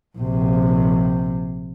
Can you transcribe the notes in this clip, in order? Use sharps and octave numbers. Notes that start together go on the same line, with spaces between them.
A#1 C3